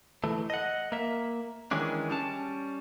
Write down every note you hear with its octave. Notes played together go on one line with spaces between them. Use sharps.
E3 A3
D#5 F#5
A#3 E5
D#3 E3 G#3 C#4 D4
G3 C#4 A5